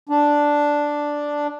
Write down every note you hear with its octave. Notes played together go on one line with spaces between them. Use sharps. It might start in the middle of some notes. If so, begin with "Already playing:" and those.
D4